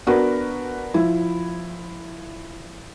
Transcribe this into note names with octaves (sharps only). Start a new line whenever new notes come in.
B3 D4 F#4 A#4 B4
F3 E4